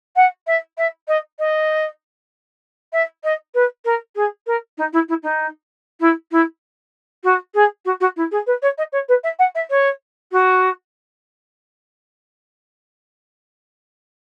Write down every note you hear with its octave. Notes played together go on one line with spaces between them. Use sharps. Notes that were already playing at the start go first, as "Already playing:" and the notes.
F#5
E5
E5
D#5
D#5
E5
D#5
B4
A#4
G#4
A#4
D#4
E4
E4
D#4
E4
E4
F#4
G#4
F#4
F#4
E4
G#4
B4
C#5
D#5
C#5
B4
E5
F#5
E5
C#5
F#4